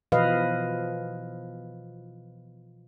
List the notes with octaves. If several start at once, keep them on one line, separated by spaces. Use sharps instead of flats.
B2 E3 F3 B4 D#5 F5